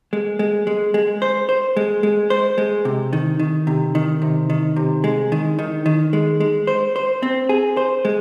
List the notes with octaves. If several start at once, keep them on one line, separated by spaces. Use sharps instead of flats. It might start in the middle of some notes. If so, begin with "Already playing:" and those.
G#3
G#3
G#3
G#3
C5
C5
G#3
G#3
C5
G#3
C3
D#3
D#3
C3
D#3
C3
D#3
C3
G#3
D#3
D#3
D#3
G#3
G#3
C5
C5
C4
G#4
C5
G#3